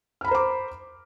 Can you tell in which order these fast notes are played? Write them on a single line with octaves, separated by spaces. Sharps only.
F6 B5 A#5 C5 D6